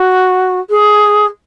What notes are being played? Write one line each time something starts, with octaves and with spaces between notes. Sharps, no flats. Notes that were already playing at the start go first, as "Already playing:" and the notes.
Already playing: F#4
G#4